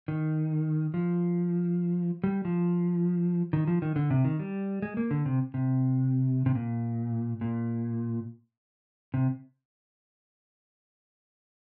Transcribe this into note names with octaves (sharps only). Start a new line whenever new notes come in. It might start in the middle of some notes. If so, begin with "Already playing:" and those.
D#3
F3
G3
F3
D#3
F3
D#3
D3
C3
D#3
G3
G#3
A#3
D3
C3
C3
C3
A#2
A#2
C3